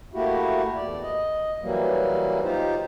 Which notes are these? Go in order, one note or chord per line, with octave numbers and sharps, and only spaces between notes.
A3 A#3 E4 F#4 G4
E2 D5
D#5
E3 F#3 G3 A#3
D#4 F4 G4 C5